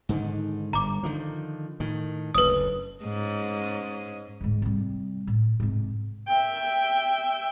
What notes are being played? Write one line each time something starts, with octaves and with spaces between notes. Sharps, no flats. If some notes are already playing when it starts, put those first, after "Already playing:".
G#2 D3 D#3
G1 A#5 D6
D3 D#3 F3
A2 D#3
F#1 D2 B4 D#6
G#2 C#4 D#5
D2 G#2
C3 G3
A2
G#2 C3
E5 G5